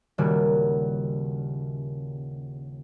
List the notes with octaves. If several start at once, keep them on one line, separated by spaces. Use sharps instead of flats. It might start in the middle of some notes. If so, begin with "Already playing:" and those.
D#1 C#3 G3 A#3 F#4